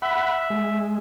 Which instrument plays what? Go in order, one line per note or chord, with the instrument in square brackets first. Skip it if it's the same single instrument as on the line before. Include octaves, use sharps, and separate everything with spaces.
[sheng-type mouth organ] E5 [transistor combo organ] F#5 B5
[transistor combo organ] G#3